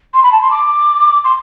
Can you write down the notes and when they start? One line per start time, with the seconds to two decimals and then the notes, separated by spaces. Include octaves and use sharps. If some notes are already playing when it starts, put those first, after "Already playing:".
0.14 C6
0.23 B5
0.32 A5
0.42 C6
0.51 D6
1.24 C6